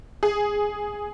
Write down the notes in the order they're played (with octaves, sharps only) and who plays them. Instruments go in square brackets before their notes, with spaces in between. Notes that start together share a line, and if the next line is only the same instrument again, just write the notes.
[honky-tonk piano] G#4